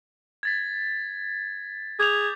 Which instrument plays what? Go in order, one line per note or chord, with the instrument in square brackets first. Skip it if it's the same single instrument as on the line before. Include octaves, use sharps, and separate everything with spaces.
[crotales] G#6 A6 B6
[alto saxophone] G#4 [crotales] D6 G6 F7